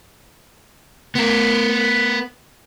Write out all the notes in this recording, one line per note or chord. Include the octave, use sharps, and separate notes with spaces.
B3 A#4